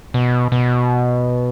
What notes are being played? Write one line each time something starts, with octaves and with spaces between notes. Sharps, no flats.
B2
B2